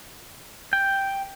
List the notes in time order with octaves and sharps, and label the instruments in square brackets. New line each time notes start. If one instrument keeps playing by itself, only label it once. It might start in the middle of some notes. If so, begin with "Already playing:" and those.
[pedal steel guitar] G5